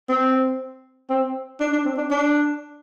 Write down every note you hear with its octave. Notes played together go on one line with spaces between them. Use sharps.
C4
C4
D4
D4
C4
D4
D4